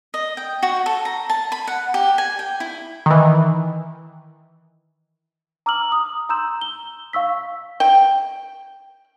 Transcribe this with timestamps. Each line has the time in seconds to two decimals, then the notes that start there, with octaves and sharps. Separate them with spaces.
0.14 D#5
0.37 G5
0.63 F#4
0.86 A4
1.05 A#5
1.30 A5
1.52 B5
1.67 F#5
1.94 G4
2.18 G#5
2.39 G5
2.60 E4
3.06 D#3 E3
5.66 A#5 D6 E6 F6 F#7
5.92 D#6
6.29 A#5 C6 E6 G6 E7
6.61 G7
7.13 F5 C#6 E6 B6
7.80 G5